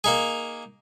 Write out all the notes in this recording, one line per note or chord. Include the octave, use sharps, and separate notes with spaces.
A#3 D#4 G#4